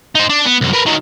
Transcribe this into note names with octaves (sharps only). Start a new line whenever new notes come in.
D#4 C5
D4
B3
C2 F#2
A#4 B4
D#3 F#3